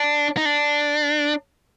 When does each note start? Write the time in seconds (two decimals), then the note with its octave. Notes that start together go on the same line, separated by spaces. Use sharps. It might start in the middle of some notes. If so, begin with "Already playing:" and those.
Already playing: D4
0.37 D#4
0.45 D4